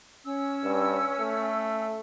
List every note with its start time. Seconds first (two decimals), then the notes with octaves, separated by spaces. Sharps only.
0.25 C#4 E6
0.64 G2
1.20 A3